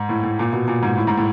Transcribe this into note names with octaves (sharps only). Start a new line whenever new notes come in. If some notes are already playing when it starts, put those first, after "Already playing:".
Already playing: G#2
A2
A2
A#2
B2
A#2
G#2
A2
G#2
A2